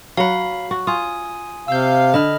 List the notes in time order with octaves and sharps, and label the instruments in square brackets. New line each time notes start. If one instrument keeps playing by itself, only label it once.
[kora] F#3 F#5 [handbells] F5 B5
[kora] F#4
[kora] F4 [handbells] G#5 D#6
[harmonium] C3 F5 [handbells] E6 G6
[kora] D3 [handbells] D#5 B5 F6